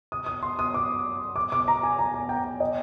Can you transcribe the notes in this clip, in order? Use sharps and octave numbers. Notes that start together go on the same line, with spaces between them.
D#6
D#6
C6
D#6
D6
D6
D6
A#5
G#5
A#5
G#5
G5
D#5